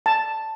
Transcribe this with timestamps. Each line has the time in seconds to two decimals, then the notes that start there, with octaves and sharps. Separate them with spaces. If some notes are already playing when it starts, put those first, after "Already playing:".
0.06 A5